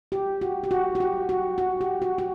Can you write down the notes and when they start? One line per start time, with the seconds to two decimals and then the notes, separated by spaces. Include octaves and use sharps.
0.12 G4
0.41 F#4
0.64 G4
0.71 F#4
0.95 F#4
1.00 G4
1.29 F#4
1.58 F#4
1.81 G4
2.02 F#4
2.18 F#4